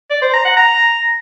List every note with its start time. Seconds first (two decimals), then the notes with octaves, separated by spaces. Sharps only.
0.10 D5
0.22 C5
0.33 A#5
0.45 F#5
0.57 A#5